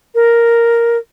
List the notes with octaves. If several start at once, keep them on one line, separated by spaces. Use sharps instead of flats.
A#4